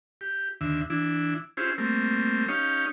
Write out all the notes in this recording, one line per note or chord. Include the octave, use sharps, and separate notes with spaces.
G4
D#2 D3 E5
E3 D4 E4
C#4 E4 F4 G4 G#4 C5
G3 A3 A#3 C4
C#4 D#4 G4 C#5 F5